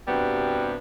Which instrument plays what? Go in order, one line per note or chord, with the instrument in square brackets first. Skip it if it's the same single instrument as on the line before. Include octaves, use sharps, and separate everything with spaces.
[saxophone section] G2 C3 G3 B3 F#4